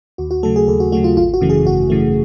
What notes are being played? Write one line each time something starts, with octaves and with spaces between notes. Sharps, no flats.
D#2 F#4
F#4
C#3 F#3 A3 A4
G#4
D#2 A4
F#4
C#3 F#3 A3 F#4
F4
G#1 F4
F#4
F#2 C#3 E3 A3
G#4
G#1 F#4
F#2 C#3 E3 A3